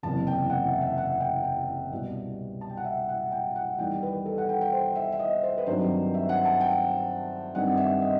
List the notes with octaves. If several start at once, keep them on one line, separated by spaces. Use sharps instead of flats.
F#1 E2 C3 A5
G5
F#5
E5
E5
F#5
G5
G5
C2 B2 G3
A5
G5
F#5
E5
F#5
G5
F#5
E2 D#3 G3 G5
B4
A4
F#5
G5
G5
C5
E5
E5
D#5
C5
B4
G2 D#3 F#3 C4 C5
E5
F#5
A5
G5
G2 D#3 G3 C4 F#5
E5
D#5